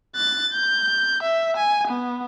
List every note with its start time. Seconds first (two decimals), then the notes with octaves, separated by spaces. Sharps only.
0.16 F#6 A6
0.53 G6
1.23 E5
1.57 G#5
1.88 B3